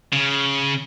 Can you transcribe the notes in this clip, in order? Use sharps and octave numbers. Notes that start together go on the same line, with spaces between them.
C#3